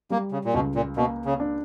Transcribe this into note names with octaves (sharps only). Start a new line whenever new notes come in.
G3 A#3
C#3
A#2
C#2 B2
A#2
B2 A#3
C#3
D4